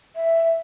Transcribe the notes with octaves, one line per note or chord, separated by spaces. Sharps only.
E5